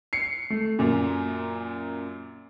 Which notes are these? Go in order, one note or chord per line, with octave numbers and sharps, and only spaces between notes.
C7 C#7
A3
F#2 A#2